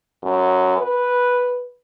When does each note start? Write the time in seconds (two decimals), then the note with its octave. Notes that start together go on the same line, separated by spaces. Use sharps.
0.23 F#2
0.78 B4